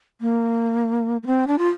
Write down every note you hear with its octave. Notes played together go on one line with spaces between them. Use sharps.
A#3
A#3
C4
D4
F4